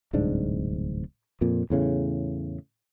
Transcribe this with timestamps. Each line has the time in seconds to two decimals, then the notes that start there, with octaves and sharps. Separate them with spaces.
0.13 D1 C2 G#2 D4
1.41 F2 A#2
1.70 E2 A2 C#3